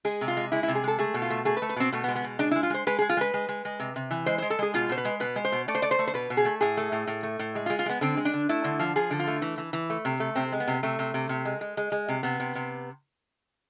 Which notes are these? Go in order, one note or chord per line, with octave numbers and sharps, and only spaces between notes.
G#3 G#4
C3
F4
G#3
G#3 E4
E4
C3
G#4
G#3 A4
A3 G#4
B2
F4
A3
A3 G#4
B4
A3
B4
B2 C4
B2 A3
B3
G#3
B3
B2
G#3 D4
E4
G#3
F4
G#3 C5
G#3 B4
G#3 G#4
F4
G#3 B4
G#3
G#3
G#3
C3
C3
E3
G#3 C5
C5
G#3
A4
G#3 G#4
B2 F4
B2 C5
B4
G#3
B2 B4
G#3
C5
B2
A3 D5
C5
A3 D5
C5
A3
C5
B2 B4
B2
G#4
A3
A2 G#4
A3
A2
A2
A3
A2
G#3
F4
G#3
F4
G#3 B3
D3 C4
G#3
D4
D3
A3 E4
D3
F3
F3 G#4
D3
F4
A3
E3
E3
E3
A3
C3
A3
C3 C4
G#3
B3
C3
C3 A3
C3
C3
C3
G#3
G#3
G#3
G#3
C3
C3 B3
C3
C3